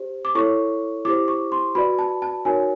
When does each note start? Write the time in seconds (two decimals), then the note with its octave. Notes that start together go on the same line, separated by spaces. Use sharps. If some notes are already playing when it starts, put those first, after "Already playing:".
Already playing: G4 C5
0.25 D6
0.35 E4 A4 C#5 C#6
1.05 E4 G4 C5 D6
1.28 C#6
1.52 C6
1.75 F#4 B4 D5 B5
1.99 A5
2.22 A5
2.45 D#4 F#4 A#4 C#5 G#5